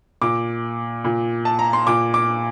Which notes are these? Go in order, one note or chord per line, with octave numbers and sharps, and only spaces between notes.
A#2 D6
A#2
A5
A#5
C6
A#2 D6
D6